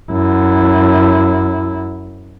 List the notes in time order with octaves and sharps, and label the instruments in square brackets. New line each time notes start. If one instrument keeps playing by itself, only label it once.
[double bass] F#2 E4